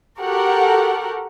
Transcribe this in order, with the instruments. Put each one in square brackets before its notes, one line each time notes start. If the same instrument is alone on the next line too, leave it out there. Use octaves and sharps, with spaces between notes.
[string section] F#4 G4 A4 A#4 F#5